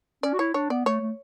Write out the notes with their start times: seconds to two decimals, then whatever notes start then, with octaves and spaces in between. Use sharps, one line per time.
0.23 C#4 D5
0.34 F#4
0.39 E4 C#5
0.54 D4 C#5
0.70 B3 D5
0.85 A3 C#5
1.01 A3